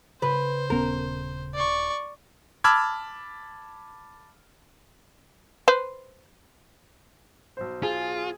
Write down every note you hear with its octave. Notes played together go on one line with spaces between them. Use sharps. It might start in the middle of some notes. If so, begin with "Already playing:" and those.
C#3 B4 C5 B5
D#1 B3 C#4 A#4
D5 C#6
A5 B5 D6 E6 F6 G#6
B4 C5
B1 C5
F4 G#4